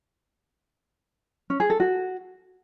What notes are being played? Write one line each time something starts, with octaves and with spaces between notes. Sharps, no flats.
C#4
G#4
A4
F#4